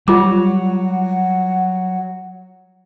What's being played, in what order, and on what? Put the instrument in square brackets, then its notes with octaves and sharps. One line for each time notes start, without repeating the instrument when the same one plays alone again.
[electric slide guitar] F#3 [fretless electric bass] G3 [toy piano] F4 D6 [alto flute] F#5